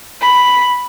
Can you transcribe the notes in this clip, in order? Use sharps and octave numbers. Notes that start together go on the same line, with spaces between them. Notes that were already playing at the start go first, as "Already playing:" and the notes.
B5